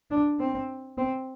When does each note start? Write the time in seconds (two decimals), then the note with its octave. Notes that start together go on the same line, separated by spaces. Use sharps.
0.11 D4
0.40 C4
0.98 C4